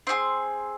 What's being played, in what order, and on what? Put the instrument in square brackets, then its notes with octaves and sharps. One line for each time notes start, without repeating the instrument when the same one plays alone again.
[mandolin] C4 F4 G#4 C6